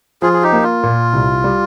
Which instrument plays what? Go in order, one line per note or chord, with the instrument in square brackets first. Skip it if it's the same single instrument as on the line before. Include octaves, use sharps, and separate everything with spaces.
[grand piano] F3 [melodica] F4 G#4
[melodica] G#4
D#4 G4
[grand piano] A#3
[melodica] F4
[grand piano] A#2
C2
G3